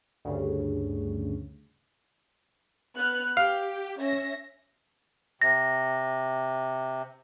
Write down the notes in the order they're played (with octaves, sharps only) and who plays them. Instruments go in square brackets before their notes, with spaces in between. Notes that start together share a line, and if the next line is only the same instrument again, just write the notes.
[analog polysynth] D2 G2 C#3
[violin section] B3 F6 F#6
[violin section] G4 [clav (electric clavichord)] F5
[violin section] C#4 E5 A#6
[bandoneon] C3 [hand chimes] A#6